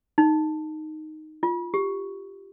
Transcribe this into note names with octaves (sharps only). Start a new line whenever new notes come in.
D#4
F4
G4